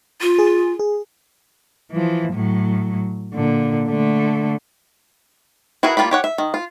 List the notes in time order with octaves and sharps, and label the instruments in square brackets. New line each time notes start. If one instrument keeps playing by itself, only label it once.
[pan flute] F4
[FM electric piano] G#4
G#4
[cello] E3 F3
A2 F#3
A#2 D3
D3 A3
[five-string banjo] E4 F#4 G#4 A#4 B4
G3 A#3 F4 G4 B5
G4 C#5 F#5
E5
D#3
F4